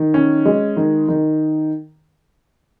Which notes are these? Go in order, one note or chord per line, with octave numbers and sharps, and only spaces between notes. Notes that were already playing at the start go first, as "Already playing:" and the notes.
Already playing: D#3
C#4
G#3
D#3
D#3